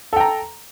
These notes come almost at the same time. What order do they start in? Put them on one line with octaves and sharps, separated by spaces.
A4 G5 A#5